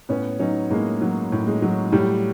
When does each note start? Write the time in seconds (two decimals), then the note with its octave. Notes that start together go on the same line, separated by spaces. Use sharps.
0.09 A2 B3 C#4
0.39 F#3 C#4 D#4
0.70 A2 G#3 A#3
1.01 F#3
1.32 A2
1.47 G#3
1.62 F#3
1.92 A2 G3